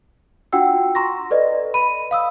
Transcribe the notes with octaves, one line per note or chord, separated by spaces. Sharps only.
D4 F4 F#4 F#5 G5 E6
A#5 C6 C#6 A#6
A4 B4 D5 D#5
B5 D#7
F5 D#6 E6